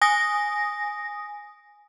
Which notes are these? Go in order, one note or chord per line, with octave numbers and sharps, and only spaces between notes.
G#5 D#6 A#6